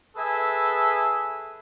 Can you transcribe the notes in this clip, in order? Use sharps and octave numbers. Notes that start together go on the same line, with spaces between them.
G#4 A4 B4 E5 G#5